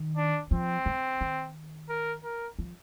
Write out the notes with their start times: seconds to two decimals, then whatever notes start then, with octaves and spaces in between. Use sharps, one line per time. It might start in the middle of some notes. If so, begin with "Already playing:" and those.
Already playing: D#3
0.17 D4
0.51 F3 C4
0.86 D3
1.21 D#3
1.89 A#4
2.24 A#4
2.59 F3